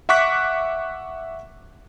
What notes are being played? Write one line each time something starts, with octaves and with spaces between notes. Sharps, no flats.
E5 F#5 C#6 D6 F#6 B6